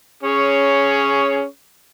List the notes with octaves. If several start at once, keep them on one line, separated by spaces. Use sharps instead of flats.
C#4 G#4 C#5